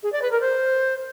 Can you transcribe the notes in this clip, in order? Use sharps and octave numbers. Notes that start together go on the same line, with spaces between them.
G#4
D5
B4
A#4
C5